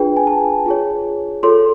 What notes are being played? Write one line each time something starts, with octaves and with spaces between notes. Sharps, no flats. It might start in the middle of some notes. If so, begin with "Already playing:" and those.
Already playing: D4 F4 G#4 B4 G5
G#5
A5
F4 G#4 C#5
F4 A4 C#5 C6